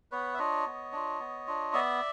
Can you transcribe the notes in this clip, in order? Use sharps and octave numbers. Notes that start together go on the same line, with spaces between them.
B3 B4 C#5
E5
D4 F4 C#5 D#5
B3
D4 F4
B3
D4 F4
B3 D5 E5